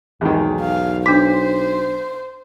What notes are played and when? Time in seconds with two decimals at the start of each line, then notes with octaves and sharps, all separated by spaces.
0.21 B1 E2 G#2 D#3
0.61 F5
1.06 D4 C5 D6 B6